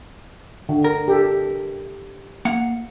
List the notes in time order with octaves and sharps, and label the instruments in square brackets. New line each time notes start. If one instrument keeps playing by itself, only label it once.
[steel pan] D3
[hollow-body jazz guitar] A#4
[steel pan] G4 A4
[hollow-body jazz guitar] A#3 F5 F#5